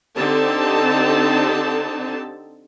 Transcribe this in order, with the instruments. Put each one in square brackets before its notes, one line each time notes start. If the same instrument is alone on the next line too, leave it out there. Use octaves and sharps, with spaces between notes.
[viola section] D3 C4 D#4 G4 A4 A5